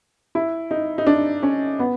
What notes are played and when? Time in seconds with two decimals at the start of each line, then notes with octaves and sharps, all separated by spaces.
0.35 E4
0.71 D#4
0.98 D#4
1.07 D4
1.43 C#4
1.79 B3